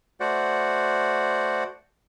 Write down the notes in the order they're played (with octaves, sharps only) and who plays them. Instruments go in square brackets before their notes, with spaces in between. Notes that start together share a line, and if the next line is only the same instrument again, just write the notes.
[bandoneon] A3 F#4 C5 D5 F#5